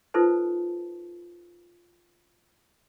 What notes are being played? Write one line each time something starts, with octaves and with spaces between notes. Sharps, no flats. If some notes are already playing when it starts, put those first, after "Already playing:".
D#4 F4 A4 B4 C5 A5